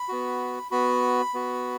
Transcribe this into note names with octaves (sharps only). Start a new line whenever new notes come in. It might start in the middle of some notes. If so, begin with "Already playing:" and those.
Already playing: B5
B3 F#4
B3 F#4 B5
B3 F#4